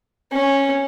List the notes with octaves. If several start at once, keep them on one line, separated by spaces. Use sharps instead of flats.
C#4